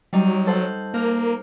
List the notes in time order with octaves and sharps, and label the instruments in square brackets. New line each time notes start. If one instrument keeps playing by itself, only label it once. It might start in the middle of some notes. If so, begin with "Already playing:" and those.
[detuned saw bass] F#3 [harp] G3 D#4
[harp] A4 C5 F#5
[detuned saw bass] A#3 [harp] A#4